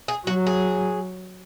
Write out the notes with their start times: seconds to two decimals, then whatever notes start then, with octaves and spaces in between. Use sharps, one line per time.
0.08 G#4
0.27 F#3 F#4
0.47 G#4